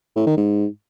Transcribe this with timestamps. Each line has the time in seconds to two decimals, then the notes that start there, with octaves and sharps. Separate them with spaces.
0.16 A2
0.26 D#3
0.37 G#2